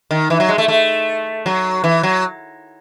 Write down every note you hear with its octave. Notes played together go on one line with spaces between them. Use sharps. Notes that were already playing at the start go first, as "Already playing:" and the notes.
D#3
E3
F#3
G#3
A3
A3
F#3
E3
F#3